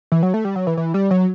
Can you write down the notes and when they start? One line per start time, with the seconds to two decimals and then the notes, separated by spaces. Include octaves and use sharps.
0.12 E3
0.23 F#3
0.34 A3
0.45 G3
0.56 F#3
0.67 E3
0.77 E3
0.94 G3
1.11 F#3